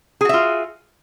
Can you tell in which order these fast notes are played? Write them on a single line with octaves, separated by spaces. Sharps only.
G#4 F#4 E5 F4